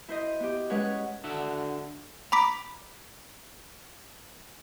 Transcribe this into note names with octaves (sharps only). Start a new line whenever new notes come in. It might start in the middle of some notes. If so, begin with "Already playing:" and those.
E4 C5 D#5
B3 G4
G#3 C#4 B4 C#5 F#5
D3 D4 F#4 E5
A#5 B5 D6 B6